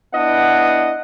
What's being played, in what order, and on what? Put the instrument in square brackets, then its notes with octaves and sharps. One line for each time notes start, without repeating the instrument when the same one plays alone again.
[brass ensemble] B3 D4 E4 D#5 F#5